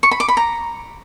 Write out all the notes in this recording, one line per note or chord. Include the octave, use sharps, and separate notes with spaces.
C#6
B5
D6
B5
A#5